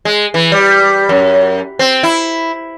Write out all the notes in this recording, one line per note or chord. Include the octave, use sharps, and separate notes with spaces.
G#3
E3
G3
F#2
C4
E4